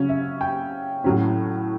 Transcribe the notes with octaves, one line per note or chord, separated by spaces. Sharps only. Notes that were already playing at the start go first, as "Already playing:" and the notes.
Already playing: C#3 F#3 C#4
E5
G5
A2 F#3 C#4